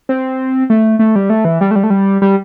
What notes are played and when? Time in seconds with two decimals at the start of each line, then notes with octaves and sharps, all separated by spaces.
0.09 C4
0.70 A3
0.99 A3
1.16 G3
1.30 A3
1.45 E3
1.61 G3
1.71 A3
1.76 G3
1.83 A3
1.90 G3
2.22 G3